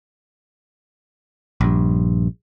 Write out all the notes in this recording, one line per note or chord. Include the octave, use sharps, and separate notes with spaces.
A#1 G2